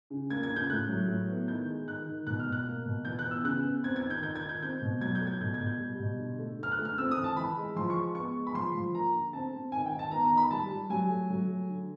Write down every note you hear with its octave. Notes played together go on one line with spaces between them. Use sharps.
C#3
A#3 G#6
G#6
C#3
G6
A2 F#6
F#3
A2
B3
D#3 G6
G#3
D#3 F#6
D#3
B2 F#6
F6
B2
F#6
A#3
B2
E3 G6
F#6
B3
E6
C#3 F#6
B3
C4 G#6
G#6
D#3
G6
D#3 G6
G#6
D#3
G6
C4 G6
B2
F#3 G#6
G6
A3
G#6
B2 G6
G#6
B2
G6
G3
B2
D3
A3
D3 F6
F#6
A3
F6
C4 E6
D#6
E3
A5
E3 B5
G#3
F3 C6
C#6
G#3
B3 C#6
G#3
B5
F3 C6
F3
A#3 A#5
D3
C4 A5
C4
D#3 G#5
G5
D#3
A5
B3 A#5
A#5
D#3
B5
G3 A5
G3
F#3 G#5
A3
F#3
A3
D3